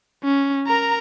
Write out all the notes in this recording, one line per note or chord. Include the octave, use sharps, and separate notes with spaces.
C#4
A#4 A#5